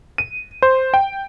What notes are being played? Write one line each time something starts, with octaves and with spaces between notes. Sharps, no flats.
D#7
C5
G5